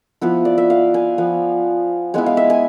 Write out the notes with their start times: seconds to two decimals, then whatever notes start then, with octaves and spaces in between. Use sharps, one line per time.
0.21 F3 B3 E4
0.45 D5
0.58 E5
0.70 F5
0.94 G#5
1.18 F3 B3 F4
2.14 G#3 B3 E4 G#5
2.26 F5
2.37 E5
2.50 G#5